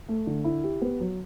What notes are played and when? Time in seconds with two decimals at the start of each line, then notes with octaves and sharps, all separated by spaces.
0.09 A3
0.27 D3
0.44 E4
0.64 G4
0.82 B3
1.00 F#3